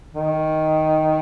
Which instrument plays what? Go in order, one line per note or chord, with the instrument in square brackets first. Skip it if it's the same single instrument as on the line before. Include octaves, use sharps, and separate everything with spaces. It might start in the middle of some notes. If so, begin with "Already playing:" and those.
[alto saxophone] D#3